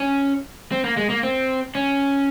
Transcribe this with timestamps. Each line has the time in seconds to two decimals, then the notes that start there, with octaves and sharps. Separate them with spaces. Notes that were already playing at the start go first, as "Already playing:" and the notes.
Already playing: C#4
0.72 C4
0.84 A#3
0.97 G#3
1.10 A#3
1.23 C4
1.75 C#4